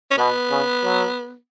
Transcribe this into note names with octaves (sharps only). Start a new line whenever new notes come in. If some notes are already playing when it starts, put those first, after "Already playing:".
C#4
B2 B3
C#3
F#3